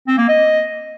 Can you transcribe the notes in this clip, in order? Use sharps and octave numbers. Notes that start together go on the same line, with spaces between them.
C4
A#3
D#5